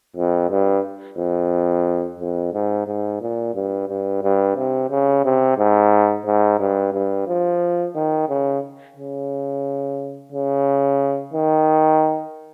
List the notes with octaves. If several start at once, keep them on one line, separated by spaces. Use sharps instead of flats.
F2
G2
F2
F2
G#2
G#2
A#2
G2
G2
G2
C3
C#3
C3
G#2
G#2
G2
G2
F3
D#3
C#3
C#3
C#3
D#3